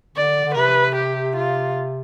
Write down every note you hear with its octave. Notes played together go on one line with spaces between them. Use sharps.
D3 D5
D3
C3 B4
G4
F4